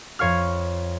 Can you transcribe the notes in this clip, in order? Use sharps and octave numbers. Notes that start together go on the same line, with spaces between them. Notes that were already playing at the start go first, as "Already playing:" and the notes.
F2 C#5 F5 F6